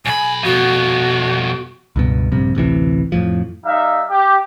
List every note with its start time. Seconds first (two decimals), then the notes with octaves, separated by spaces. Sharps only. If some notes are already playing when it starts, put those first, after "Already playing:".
0.05 B1 G#5 B5
0.44 F2 B2 F#4
1.96 C#2 G2 B2
2.32 A#1 G2 C3
2.55 A1 D2 C3 E3
3.12 F2 A2 F3
3.65 G3 D#4 E5 F5
4.11 G4